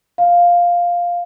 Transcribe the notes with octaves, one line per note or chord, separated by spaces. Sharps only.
F5